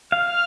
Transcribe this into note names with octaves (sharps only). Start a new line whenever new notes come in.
F5 F6